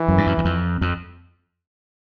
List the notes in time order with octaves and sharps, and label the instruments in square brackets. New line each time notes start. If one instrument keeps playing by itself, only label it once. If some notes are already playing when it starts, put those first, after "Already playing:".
Already playing: [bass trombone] E3
[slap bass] F#2
G2
F#2
E2
F2
F2